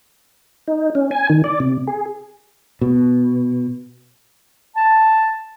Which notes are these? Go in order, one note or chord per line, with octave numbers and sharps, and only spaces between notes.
D#4
C#4
G#5
D#3
D5
C3
G#4
B2
A5